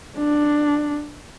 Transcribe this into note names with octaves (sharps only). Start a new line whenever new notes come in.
D4